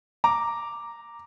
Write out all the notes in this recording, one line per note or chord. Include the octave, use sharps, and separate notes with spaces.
A#5 D6